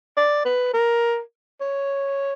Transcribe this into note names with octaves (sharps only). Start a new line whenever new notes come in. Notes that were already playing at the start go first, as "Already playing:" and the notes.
D5
B4
A#4
C#5